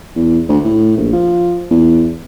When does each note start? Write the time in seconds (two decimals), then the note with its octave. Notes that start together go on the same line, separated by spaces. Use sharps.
0.16 E2
0.49 D2
0.64 A2
0.97 A#1
1.13 F3
1.71 E2